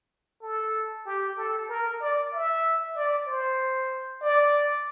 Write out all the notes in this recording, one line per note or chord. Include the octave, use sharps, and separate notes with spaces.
A4
G4
A4
A#4
D5
E5
D5
C5
D5